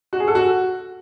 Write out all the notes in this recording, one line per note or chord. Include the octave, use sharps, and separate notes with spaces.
F#4
G#4
A4
F#4